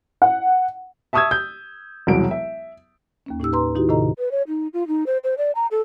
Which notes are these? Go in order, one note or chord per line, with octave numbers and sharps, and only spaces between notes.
F#5
E5 A5 C#6 D#6 E6 G#6
G6
E1 C2 F#3 D7
E5
D#2 A#3 C#4
A2 D#4 G4 E6
B4 A#5 C6
D#3 D#4 E4 F#4 G4
A2 C3 D#3 A4 D#5 A#5
B4
C#5
D#4
F4
D#4
C5
C5
D5
A#5
A4